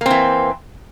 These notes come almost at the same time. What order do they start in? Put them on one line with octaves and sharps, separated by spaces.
A#3 C4 E3